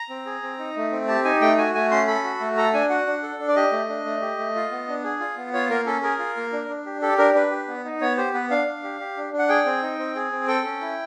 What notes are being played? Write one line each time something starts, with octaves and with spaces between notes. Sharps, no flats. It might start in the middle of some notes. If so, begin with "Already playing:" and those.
Already playing: A#5
C4
G#4
C4
D#4
A3
C4
G4 A5
D#4 G#5
A3 G5
F#4 G#5
A3 G#5
C#4 C6
A4 B5
F#4
A3
A4 A#5
D4 G#5
F#4 F#5
D4
A4
D4
D5
G4 D#5
A3
D4
A3
G4
A3
F4
B3
D4
G#4
F4
B3
F4 C#5
A#3 A#4
C#4 A4
G#4 A#4
F4
A#3
D4
D4
G4
G4 A4
D4 A#4
D4 B4
G4
B3
D#4
B3 C#5
G4 C5
B3 B4
D4 F5
D4
G4
G4
D4
D4
F#5
G#4 G5
C4
D#4
C4
G#4
C4
A4 G5
C#4
E4